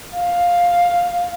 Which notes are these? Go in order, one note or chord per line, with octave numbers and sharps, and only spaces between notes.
F5